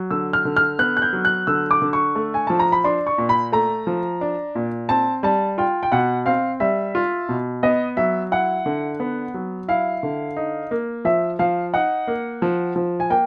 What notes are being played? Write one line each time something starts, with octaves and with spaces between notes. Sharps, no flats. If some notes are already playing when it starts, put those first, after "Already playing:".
Already playing: F#3
D3 E6
F6
D3
F6
B3 F#6
F#6
G6
F#3
F#6
D3 E6
D6
D3
C#6
A3
G#5
F3 A5
A#5
B5
D4 C6
C#6
A#2
B5
A3 A#5
F3
D4
A#2
C4 A5
G3 A5
F4 G5
G5
B2 F#5
C4 F5
G3 E5
F4
B2
B3 D#5
F#3 E5
E4 F#5
D3
B3
F#3
E4 F5
D3
D#4
A#3
F3 E5
F3 F5
D#4 F#5
A#3
F3
F3
G#5
A#3 G5